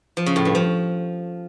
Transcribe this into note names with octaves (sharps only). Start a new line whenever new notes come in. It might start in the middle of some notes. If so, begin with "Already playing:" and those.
F3
C#3
A2
G2
F3